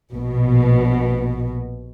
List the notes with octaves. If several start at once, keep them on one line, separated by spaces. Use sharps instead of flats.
A#1 B2